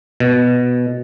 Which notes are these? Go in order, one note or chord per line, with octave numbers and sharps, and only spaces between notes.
B2